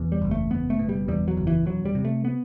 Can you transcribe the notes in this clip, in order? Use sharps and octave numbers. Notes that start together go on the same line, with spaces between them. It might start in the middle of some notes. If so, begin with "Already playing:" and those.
Already playing: E2 B2
G3
F#1
A3
F#1 B3
A3
B2
G3
E2 G3
F#3
F#1
E3
E1 F#3
G3
C3
A3
B3